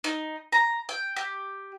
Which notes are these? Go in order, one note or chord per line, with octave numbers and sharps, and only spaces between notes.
D#4
A#5
G5
G4